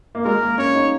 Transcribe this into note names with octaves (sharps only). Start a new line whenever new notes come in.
A#3
G#3 A#4
A#3
C#4 C#5
D#4